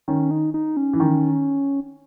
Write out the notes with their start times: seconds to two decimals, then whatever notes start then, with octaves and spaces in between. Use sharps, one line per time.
0.08 D#3 C#4
0.31 D#4
0.54 D#4
0.77 C#4
0.93 E3
1.00 D#3